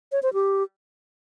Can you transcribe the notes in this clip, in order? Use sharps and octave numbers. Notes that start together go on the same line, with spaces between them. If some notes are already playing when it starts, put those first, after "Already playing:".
C#5
C5
G4